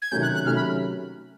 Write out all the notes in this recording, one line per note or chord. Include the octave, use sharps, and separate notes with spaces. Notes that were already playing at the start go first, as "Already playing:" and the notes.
G#6
C3 D#3 F#3 A3 C#4 G6
F#6
F#6
C3 D#3 F#3 A3 C#4 F6
B5